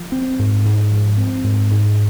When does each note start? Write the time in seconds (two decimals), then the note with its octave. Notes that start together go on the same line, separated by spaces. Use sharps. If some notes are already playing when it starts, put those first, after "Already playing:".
Already playing: F3
0.12 C4
0.39 G#2
0.65 G#2
0.91 F3
1.17 C4
1.44 G#2
1.71 G#2